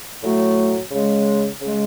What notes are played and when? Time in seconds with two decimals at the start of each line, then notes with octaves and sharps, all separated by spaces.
0.23 A2 F#3 A3
0.92 C#3 G#3
1.61 C#3 G#3